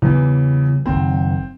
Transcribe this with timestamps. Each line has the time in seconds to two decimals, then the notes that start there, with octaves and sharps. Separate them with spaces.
0.02 E2 C#3 E3 G3 B3
0.86 F#1 D#3 C4